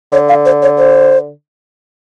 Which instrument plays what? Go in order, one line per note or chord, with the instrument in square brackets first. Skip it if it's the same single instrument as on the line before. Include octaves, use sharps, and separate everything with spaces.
[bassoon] D3 [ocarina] C#5
[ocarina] F5
C5
C#5
C5